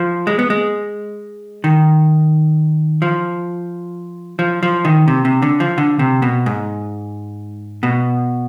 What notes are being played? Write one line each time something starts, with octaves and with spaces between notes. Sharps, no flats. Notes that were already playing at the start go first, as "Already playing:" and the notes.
Already playing: F3
G#3
B3
G#3
D#3
F3
F3
F3
D#3
C3
C3
D3
F3
D3
C3
B2
G#2
B2